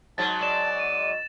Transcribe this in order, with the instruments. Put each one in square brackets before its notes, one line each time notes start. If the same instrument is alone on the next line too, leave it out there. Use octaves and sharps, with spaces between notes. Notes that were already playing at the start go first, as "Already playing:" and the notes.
[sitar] G#2 F#3 [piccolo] A5 [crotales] A6
[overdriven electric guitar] D5 [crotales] E7
[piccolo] D#7